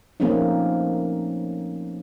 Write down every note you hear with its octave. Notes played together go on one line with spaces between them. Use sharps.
F3 A3 A#3 C4 C#4 D#4